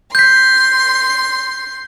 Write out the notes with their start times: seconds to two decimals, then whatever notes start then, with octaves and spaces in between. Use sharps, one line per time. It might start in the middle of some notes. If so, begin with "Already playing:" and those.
0.15 C6 G6 B6